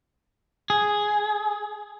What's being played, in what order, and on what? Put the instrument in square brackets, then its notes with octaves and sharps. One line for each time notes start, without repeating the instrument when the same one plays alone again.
[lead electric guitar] G#4